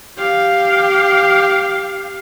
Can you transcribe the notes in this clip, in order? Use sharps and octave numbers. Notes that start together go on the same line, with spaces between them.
G4 F5